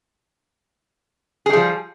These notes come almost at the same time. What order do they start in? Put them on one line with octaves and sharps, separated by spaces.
G#4 G3 F3